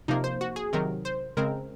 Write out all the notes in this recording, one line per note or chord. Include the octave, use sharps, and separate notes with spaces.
C3 F3 A#3 D#4
C5
F#4
G#4
C3 D#3 F#3 A#4
C5
C#3 G#3 C4 A#4